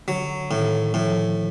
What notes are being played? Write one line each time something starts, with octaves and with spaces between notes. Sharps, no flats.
D3 F#3
A2 D#3
A2 F3